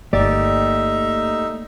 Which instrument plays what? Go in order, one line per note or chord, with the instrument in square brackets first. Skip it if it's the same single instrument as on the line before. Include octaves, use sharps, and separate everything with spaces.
[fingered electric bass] G1 [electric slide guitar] A3 A#3 G4 [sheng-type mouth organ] D#4 E5 [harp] D5